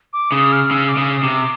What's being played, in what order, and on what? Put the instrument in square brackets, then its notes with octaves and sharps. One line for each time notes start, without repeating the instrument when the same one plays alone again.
[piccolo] D6
[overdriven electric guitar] C#3 [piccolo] D#6
[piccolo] F6
[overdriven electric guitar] C#3 [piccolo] E6
[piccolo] D6
[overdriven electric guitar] C#3 [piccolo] D#6
[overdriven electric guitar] C3 [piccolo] D6